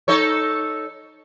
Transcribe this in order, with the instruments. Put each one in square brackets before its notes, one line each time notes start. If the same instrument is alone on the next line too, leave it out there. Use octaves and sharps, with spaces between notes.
[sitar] D#4 A4 C#5